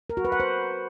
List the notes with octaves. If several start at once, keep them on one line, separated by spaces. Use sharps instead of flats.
A#4
F#4
B4
F#5
C5